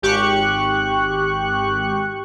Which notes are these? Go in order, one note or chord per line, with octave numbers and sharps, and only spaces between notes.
G#1 G4 C#6 F#6